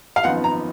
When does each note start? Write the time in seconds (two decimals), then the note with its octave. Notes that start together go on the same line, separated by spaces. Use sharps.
0.16 F5
0.24 G#1 F#2 F3 B3 D#4 F#5
0.44 A#5